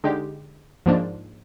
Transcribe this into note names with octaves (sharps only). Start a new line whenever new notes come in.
D3 G#3 D#4 G4
G#2 F3 A#3 D4